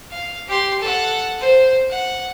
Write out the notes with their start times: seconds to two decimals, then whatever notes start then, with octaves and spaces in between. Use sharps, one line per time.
0.11 F5
0.48 G4 C6
0.80 A4 F#5
1.40 C5
1.90 F#5